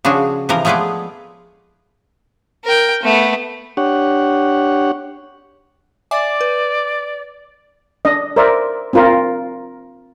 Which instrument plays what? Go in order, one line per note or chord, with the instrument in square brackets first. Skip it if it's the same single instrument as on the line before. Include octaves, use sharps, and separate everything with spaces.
[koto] C#3 F3 D4 F#4 G#4
C3 E3 F3 A#4
F3 G#3 A3 B3 G#4 D5
[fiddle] A#4 G5
A3 B3
[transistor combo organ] D4 G4 C#5 F#5
[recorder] D5 [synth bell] E5 G#5 D6
[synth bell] B4
[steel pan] D4 D#5
A#4 C5 D5 E5
C4 D4 F4 A#4